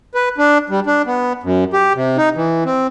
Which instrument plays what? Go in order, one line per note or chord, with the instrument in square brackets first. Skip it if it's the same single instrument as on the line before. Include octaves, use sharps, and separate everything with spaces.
[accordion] B4
D4
G3
D4
B3
F#2
G4
C3
D#4
E3
C4